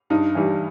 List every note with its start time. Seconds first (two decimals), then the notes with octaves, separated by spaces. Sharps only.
0.10 G2 D#4
0.35 E3 G3